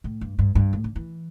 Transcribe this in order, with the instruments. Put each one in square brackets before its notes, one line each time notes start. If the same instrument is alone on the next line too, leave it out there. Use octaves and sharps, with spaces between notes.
[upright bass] A2
G2
G2
G2
A2
D3
E3